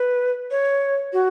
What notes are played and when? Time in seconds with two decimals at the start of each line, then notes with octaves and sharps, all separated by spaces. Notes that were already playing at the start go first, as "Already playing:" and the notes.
Already playing: B4
0.51 C#5
1.13 F#4